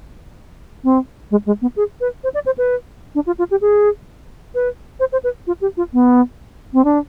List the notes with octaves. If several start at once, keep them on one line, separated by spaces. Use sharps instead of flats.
C4
G#3
G#3
B3
G#4
B4
C5
D5
C5
B4
D4
F4
F4
G4
G#4
B4
C5
C5
B4
F4
G4
F4
B3
C4
D4